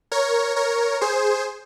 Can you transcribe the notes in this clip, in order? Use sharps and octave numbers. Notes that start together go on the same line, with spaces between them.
A#4 C#5
A#4 C#5
G#4 C5